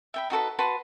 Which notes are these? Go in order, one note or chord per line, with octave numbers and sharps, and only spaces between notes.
E5 G5 B5
D#4 F#4 A4 B4
F#4 B4 A5 C6